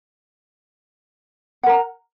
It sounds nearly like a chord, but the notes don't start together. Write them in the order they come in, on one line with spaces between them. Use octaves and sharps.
F#5 A#4 A#5